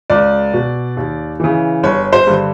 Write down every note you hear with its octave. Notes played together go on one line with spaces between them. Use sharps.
C#2 D5
B2
D#2
C#3 E3
G1 C#5
C5
G2 D3